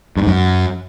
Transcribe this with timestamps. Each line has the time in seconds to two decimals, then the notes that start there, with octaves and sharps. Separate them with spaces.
0.17 G2
0.22 G#2
0.27 F#2